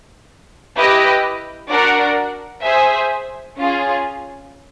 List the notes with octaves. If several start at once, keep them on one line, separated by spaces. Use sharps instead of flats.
E4 G4 B4 D#5
D4 F#4 A#4 D5 F#5
G#4 C5 E5
C#4 F4 G#4